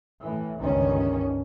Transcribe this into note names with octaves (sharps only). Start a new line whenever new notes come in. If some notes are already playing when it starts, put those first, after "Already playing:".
A2 E3
G1 C#2 G2 D#3 C#4